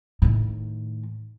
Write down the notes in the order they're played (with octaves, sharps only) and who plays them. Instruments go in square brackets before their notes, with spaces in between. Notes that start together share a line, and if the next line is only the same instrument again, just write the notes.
[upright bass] A2 D#3